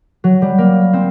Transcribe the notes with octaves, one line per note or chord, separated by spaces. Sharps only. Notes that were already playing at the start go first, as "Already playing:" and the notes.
F#3
G3
A#3
C4